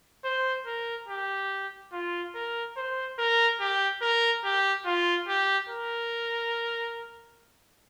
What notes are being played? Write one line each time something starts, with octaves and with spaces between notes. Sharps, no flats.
C5
A#4
G4
F4
A#4
C5
A#4
G4
A#4
G4
F4
G4
A#4